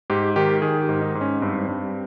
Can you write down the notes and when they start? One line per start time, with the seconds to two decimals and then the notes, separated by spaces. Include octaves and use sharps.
0.10 G#2 G4
0.36 D#3 G4
0.62 D#3 G#4
0.82 G4
0.89 G#2
1.01 D#4
1.15 G#2
1.21 C#4
1.42 G2 C4
1.68 G2